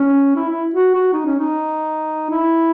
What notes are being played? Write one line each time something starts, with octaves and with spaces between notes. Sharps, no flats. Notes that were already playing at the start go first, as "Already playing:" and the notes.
Already playing: C#4
E4
E4
F#4
F#4
D#4
C#4
D#4
E4